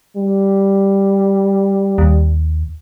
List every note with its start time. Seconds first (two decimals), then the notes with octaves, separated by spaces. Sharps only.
0.16 G3
1.98 D#2